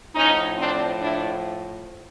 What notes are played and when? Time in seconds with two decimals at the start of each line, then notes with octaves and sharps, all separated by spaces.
0.14 A2 F3 C#4 D#4
0.57 C4 D4
1.00 D4 E4